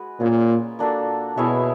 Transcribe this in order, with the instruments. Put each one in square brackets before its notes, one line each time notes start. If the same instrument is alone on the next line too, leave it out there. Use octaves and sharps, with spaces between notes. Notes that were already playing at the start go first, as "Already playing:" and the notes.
Already playing: [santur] G#3 F#4 B4
[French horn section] A#2 [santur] C#4 F4 G#4
[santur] A#3 D4 F#4 A4
[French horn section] B2 [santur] E4 G#4 C#5 E5